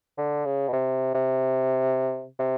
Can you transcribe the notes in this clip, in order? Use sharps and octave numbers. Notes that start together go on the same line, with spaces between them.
D3
C#3
B2
C3
C3
C3